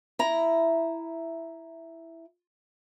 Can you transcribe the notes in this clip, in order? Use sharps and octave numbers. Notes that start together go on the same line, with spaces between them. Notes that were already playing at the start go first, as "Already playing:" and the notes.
E4 A#5